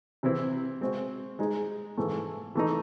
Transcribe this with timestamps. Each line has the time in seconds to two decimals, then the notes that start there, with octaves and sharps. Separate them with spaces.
0.23 C3 E3 C4 E4
0.81 G#3 C4 F#4 C5
1.39 G#3 D#4 G#4
1.97 G#2 E3 A3
2.55 E3 A3 D#4